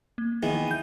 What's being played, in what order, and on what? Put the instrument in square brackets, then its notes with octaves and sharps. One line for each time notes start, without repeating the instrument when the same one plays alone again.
[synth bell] A#3
[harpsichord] D#3 E3 B3 [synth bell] G#4
[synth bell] G6 D#7